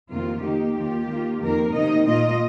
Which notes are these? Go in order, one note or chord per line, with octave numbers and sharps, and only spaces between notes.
F2 C3 D#3 A#3 F4
D#3 A#3 D#4 G4
D#2 D#3 A#3 F4
D#3 A#3 F4
F2 D#3 A#3 A#4
C3 D#3 A#3 D#4 D#5
A#2 A#3 F4 D#5